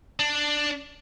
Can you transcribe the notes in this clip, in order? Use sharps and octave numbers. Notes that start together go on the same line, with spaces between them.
D4